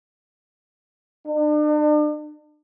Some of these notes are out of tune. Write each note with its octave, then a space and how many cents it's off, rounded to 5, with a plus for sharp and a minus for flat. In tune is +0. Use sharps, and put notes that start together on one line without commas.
D4 +40